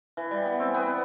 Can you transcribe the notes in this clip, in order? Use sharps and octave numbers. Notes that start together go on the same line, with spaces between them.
E3
G3
B3
C4
B3